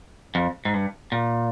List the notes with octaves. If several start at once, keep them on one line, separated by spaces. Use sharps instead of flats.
F2
G#2
G2
A#2